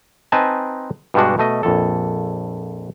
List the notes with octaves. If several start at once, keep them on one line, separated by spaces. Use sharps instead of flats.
C4 D#4 B4 D#5 G#5 A5
G2 B2 G3 G#3 D4 F#4
B2 A3 D#5
A#1 F2 A4